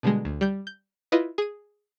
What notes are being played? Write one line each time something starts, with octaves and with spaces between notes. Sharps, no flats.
B2 D3 G3 G#3
D2
G3 G6
G6
E4 F4 B4 D#5
G#4 D#7